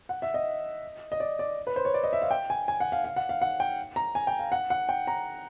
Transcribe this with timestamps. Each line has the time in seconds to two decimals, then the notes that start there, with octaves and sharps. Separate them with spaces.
0.09 F#5
0.22 E5
0.34 D#5
1.12 D#5
1.20 D5
1.39 D5
1.67 B4
1.76 C5
1.85 C#5
1.94 D5
2.04 D#5
2.13 E5
2.22 F5
2.31 G5
2.50 G#5
2.68 G#5
2.80 F#5
2.92 F5
3.04 F5
3.16 F#5
3.29 F5
3.42 F#5
3.60 G5
3.96 A#5
4.15 G#5
4.27 G5
4.39 F5
4.52 F#5
4.70 F#5
4.89 G5
5.07 A#5